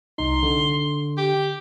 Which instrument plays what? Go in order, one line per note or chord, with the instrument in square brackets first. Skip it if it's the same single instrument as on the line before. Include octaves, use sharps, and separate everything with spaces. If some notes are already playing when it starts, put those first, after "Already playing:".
[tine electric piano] C2 D#4 [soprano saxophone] C6
[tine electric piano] D3
[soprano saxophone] G4